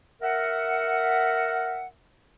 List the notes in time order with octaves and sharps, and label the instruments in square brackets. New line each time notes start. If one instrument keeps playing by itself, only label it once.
[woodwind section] A#4 E5 F#5